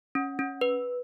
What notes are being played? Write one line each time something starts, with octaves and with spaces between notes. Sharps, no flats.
C#4
C#4
B4